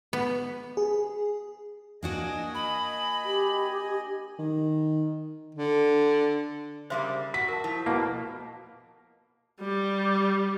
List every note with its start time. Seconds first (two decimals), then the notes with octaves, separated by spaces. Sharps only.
0.13 B3
0.77 G#4
2.03 A#3 D4 F#4 D#5 G#5
2.54 B5
3.24 G4
4.39 D#3
5.55 D3
6.90 C#3 G3 A#3 C5 E5 C6
7.34 F#4 B6
7.48 A#4 A5
7.64 F3 E4
7.86 B2 A#3 E4 A5
9.61 G3